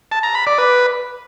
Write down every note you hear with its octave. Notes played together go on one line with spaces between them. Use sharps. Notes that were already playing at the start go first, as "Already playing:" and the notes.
A5
A#5
B5
D5
B4